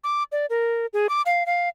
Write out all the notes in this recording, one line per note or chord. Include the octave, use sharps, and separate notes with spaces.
D6
D5
A#4
G#4
D6
F5
F5